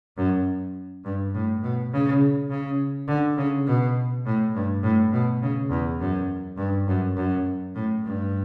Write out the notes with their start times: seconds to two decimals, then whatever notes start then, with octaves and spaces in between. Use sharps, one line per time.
0.17 F#2
1.05 G2
1.35 A2
1.63 B2
1.93 C#3
2.50 C#3
3.08 D3
3.37 C#3
3.67 B2
4.26 A2
4.55 G2
4.83 A2
5.12 B2
5.42 C#3
5.70 E2
6.00 F#2
6.58 G2
6.88 F#2
7.16 F#2
7.75 A2
8.04 G2